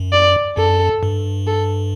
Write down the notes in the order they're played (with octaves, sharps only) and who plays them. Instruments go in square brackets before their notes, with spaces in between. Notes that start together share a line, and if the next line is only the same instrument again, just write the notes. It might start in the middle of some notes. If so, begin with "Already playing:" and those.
Already playing: [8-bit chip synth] F#2
[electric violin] D5
[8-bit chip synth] F#2 [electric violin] A4
[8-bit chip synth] G2
[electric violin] A4